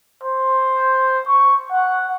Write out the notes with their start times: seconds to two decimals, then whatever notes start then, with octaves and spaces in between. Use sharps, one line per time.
0.23 C5
1.28 C#6
1.71 F#5